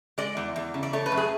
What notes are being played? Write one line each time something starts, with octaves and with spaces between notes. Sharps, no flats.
G#3 D5
E2
E2
C#3
D5
A3 C#5
B4
F#2
G#4